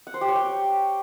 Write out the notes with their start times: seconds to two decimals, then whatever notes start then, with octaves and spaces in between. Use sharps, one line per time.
0.07 F#5
0.14 C5
0.21 G4
0.29 C#5
0.36 G5